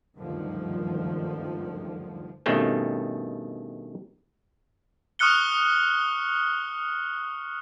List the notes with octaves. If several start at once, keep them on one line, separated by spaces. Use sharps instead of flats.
F#1 D2 G2 D3 D#3 F3
G2 B2 D#3 A3 C4 C#4
C#6 D#6 F6 F#6 C#7 G7